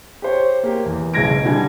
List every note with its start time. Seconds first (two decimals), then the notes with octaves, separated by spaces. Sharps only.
0.22 G4 C5 C#5
0.63 A#3 G4
0.86 E2
1.14 F#1 B1 G#3 G#6 A#6 D7
1.45 D3 G3 G#5 G#6